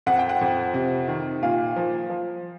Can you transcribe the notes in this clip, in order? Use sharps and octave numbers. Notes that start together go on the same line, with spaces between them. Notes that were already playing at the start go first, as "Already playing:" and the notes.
F2 F#5
G5
F#5
F2
C3
D#3
A#2 F5
F3
F3